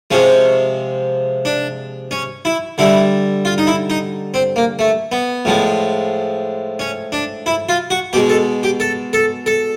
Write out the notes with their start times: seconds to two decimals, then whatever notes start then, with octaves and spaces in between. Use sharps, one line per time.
0.11 C3 F3 G#3 C#4
1.45 D4
2.11 C#4
2.45 E4
2.78 D3 G3 E4
3.45 F4
3.58 D#4
3.67 E4
3.90 D#4
4.34 C4
4.56 A#3
4.79 A3
5.12 B3
5.45 A2 F3 G#3
6.79 C#4
7.12 D4
7.46 E4
7.69 F4
7.90 F#4
8.13 B2 G#3 G4
8.29 A4
8.63 G4
8.80 A4
9.13 A4
9.46 A4